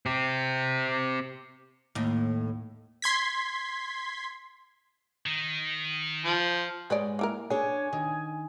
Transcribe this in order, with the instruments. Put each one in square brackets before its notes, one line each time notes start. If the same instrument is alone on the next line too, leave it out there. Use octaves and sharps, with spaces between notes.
[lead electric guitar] C4 G4
[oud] D#2 A2
[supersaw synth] C6 G#6 B6
[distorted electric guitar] D#3
[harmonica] F3
[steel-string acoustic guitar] G#2 G#3 [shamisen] B4 C#5 D5
[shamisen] A#3 E4 A#4
[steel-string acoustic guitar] D4 C#5 [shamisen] G#4 [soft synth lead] G#5
[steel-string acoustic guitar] D#3